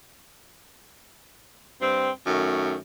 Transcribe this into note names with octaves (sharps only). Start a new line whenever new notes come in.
G2 C4
F#2 D#3 A3